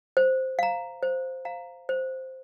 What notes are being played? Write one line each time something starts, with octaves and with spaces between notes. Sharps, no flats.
C5
F5 A#5
C5
F5 A#5
C5